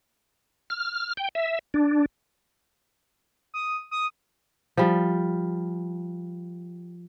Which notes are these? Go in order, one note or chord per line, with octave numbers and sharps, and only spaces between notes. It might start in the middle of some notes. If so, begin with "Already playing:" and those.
F6
G5
E5
D4
D#6
D#6
F3 G3